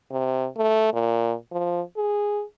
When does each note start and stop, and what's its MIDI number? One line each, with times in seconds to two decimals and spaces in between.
0.11 0.47 48
0.57 0.90 57
0.93 1.34 46
1.52 1.81 53
1.97 2.43 68